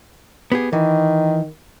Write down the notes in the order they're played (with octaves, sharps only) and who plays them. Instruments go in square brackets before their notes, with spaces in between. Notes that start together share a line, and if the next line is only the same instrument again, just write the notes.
[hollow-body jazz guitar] B3 G4 G#4
[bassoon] D#3 [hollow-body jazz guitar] E3